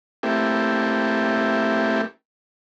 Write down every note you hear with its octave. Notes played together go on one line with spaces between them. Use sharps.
A3 A#3 C4 E4 G4